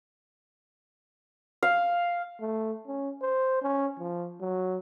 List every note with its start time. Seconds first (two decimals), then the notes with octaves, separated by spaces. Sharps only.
1.63 F5
2.40 A3
2.87 C#4
3.22 C5
3.62 C#4
3.99 F3
4.41 F#3